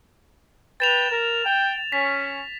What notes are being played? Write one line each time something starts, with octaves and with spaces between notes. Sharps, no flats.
B4 G5 A6 E7 F7
A#4
G5
C#4 B6